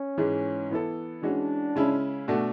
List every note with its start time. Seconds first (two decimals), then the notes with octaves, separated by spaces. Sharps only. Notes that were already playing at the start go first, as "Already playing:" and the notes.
Already playing: C#4
0.18 G#2 E3 G#3
0.70 E3 B3 E4 A4
1.22 E3 G#3 C#4 D4 F#4
1.76 C#3 G#3 C#4 E4
2.28 B2 A3 D4 F#4